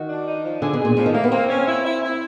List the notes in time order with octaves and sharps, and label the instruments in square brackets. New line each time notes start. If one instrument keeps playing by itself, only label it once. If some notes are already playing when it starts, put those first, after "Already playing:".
Already playing: [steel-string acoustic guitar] D#3 [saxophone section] F#4
[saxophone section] D4
D#4
F3
[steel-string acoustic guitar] D3 [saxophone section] G#4
[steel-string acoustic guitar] B2
[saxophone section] G#4
[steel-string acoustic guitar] A#2
[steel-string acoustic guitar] A2 [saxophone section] F3
[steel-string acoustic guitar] D#3
[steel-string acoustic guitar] A3 [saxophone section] A#3
[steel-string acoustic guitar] B3
[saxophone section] A#3 [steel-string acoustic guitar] C4
[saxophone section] C#4
E4
E4
E4